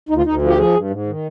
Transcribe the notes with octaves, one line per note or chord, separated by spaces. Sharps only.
D2 D#4
F4
D2 D#4
F3
G4
F3 G#4
G2
G#2
D#3